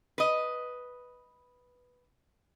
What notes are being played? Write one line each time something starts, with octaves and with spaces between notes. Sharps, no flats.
B4 D#5